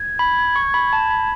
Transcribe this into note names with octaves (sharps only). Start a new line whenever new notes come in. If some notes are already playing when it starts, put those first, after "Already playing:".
Already playing: G#6
B5
C#6
B5
A5
B5